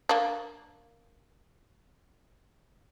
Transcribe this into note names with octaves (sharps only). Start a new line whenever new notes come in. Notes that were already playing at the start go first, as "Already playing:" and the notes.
A#3 D4